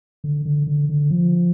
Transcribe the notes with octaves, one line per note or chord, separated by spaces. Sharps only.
D3
D3
D3
D3
F3